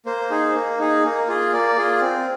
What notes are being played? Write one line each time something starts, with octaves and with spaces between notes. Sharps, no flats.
A#3 C5
D#4 G#4
A#3
D#4 G#4
A#3
F4 G#4
A#3 D5
F4 G#4
C4